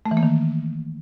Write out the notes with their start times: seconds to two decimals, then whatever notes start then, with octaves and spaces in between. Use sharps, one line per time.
0.06 A3
0.11 E3
0.17 A#3
0.23 D#3